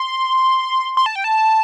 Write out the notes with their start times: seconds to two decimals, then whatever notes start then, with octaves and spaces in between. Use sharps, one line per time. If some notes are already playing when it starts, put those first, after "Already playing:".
Already playing: C6
0.97 C6
1.06 A5
1.15 G5
1.24 A5